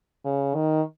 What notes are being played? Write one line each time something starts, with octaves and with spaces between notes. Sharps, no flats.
C#3
D#3